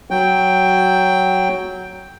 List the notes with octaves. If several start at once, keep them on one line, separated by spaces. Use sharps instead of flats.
F#3 G5